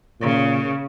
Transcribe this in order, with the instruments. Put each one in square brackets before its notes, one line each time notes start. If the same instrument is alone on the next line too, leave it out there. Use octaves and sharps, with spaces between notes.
[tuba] A#2 [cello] C#3